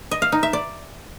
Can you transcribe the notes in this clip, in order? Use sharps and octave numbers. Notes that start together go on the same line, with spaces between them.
D#5
F5
D#4
E5
D5